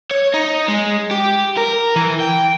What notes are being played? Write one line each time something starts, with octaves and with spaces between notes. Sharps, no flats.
C#5
D#4
G#3
G4
A#4
E3
G5